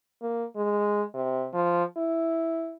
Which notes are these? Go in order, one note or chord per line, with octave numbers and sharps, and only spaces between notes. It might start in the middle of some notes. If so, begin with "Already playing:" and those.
A#3
G#3
C3
F3
E4